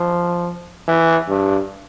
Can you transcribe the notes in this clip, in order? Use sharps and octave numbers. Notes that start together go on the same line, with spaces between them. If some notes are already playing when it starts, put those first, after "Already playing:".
Already playing: F3
E3
G2